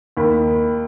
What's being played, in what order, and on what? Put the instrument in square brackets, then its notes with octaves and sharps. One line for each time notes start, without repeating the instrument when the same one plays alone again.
[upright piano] D#2 B5